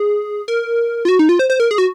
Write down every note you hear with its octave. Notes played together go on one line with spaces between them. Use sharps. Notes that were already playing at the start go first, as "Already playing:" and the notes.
Already playing: G#4
A#4
F4
F#4
D#4
F4
C5
C5
A#4
G#4
F#4